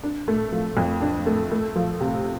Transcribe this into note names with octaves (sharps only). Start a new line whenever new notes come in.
D4
A3
F3
F2
D4
A3
A3
F3
C3